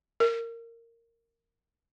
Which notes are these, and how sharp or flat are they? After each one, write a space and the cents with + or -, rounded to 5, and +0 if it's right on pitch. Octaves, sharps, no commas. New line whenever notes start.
A#4 -15